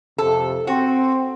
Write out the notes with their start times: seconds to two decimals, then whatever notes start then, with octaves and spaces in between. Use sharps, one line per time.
0.18 F2 C3 A4
0.67 C4 F#4